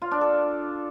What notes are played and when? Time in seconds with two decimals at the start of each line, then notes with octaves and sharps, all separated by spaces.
0.02 F4
0.11 D4
0.21 A4